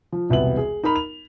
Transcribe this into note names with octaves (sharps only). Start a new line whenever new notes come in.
F3
E1 C2 C3 B3 F#4 F#7
G#4
D#4 A#4 B5 F7
F7